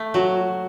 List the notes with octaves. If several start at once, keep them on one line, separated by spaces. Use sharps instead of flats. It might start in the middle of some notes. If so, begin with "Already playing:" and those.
Already playing: A3
F#3 F#4